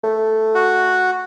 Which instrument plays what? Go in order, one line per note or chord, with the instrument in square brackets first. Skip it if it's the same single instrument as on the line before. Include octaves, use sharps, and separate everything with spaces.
[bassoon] A3
[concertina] F#4